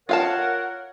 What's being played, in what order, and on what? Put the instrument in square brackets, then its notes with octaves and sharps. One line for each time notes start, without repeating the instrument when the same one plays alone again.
[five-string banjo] F4 F5 A5 [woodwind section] A#4 C#5 F#5